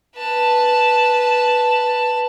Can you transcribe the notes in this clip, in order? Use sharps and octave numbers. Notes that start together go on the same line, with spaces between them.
B4 A5